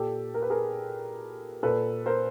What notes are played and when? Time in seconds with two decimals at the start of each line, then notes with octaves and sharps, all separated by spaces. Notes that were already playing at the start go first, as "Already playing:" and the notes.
Already playing: A#2 G4 A4
0.34 A#4
0.42 B4
0.50 G#4 A#4
1.63 A#2 A4 B4
2.06 A#4 C5